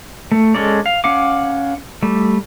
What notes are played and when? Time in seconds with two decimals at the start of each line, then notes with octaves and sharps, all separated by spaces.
0.32 A3
0.55 G#3 C#4 A4 D5
0.86 F5
1.04 C#4 F5 F#5 D6
2.03 G3 A3